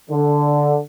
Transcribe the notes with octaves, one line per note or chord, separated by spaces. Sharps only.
D3